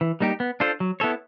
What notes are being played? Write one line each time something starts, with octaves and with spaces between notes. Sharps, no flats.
E3
G3 A#3 D#4 G4
B3
D4 F4 A4 C5
F#3
B3 E4 A4 C#5